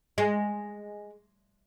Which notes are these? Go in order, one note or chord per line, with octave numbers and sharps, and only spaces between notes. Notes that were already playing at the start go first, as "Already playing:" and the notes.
G#3